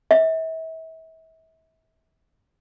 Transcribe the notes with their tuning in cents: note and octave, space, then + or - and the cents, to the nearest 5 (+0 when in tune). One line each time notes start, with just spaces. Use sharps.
E5 -35